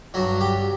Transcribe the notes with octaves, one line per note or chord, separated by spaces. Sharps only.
G2 F#3 F#4
G4